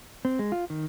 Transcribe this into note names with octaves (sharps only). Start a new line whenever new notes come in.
C4
G#3
F4
D#3